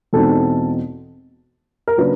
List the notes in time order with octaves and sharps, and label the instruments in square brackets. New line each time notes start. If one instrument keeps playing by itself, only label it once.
[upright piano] E2 B2 G#3 C4 D#4 A4
A#4
C#3 F#3 A#3 D4 B4